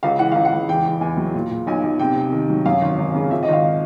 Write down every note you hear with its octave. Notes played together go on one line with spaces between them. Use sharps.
C#2 F5
E3 F#5
C#2 F5
F#5
C#2
E2 G5
E2
E2 G#5
F#3
A#2
A#2
B1 G#5
B1
C3 G5
C3
D#3
F#3
F#2 F5
G#1
G#1
C#3
F3 E5
D#5
G#1 F5